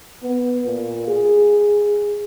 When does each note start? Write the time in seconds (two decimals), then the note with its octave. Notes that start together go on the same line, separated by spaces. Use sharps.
0.23 B3
0.65 A#2
1.08 G#4